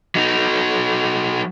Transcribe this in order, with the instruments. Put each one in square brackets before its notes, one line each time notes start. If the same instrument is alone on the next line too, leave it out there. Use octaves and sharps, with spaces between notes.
[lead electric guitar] F#3 D#4